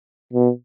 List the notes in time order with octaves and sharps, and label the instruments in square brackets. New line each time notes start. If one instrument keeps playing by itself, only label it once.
[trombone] B2